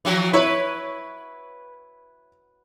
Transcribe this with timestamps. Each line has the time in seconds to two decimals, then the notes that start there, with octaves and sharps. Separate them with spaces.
0.05 E3 F3 F#4
0.33 E4 B4 C#5